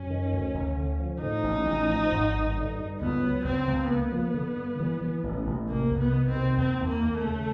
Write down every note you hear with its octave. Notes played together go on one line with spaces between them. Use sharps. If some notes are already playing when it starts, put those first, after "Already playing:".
Already playing: F#2 C#4
D#3
D2
D2
D3
F3
A2 D#4
A1
A1
F3
G#1
G2
D3
G2
C#2 B3
F#3
C#2 C4
C#2
A#3 B3
F3
D3
G2
E3
E3
A1
A1
C3 A#3
C2
B3
D#3
C4
C3
D#2 C4
D#2
A#3
D#2
A3
C#3